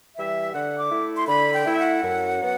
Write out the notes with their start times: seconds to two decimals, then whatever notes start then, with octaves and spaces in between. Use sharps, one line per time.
0.16 E3 G3 E5
0.53 D3 F#5
0.79 D6
0.91 A3 E4
1.17 C6
1.28 D3 B5
1.54 G5
1.66 A3 E4
1.73 E5
1.79 F#5
2.03 F#2
2.40 F#3 B3